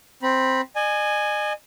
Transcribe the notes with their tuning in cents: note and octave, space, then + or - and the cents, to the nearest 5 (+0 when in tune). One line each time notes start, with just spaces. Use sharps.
C4 +0 B5 -20
D#5 -45 G#5 +0